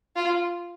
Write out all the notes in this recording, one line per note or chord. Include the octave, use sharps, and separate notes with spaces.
F4